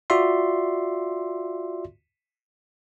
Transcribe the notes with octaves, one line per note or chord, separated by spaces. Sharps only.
F4 F#4 D5 E5 C6